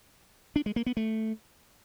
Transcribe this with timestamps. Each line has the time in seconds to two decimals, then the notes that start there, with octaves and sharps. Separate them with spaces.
0.56 D4
0.66 G#3
0.76 A#3
0.86 B3
0.97 A3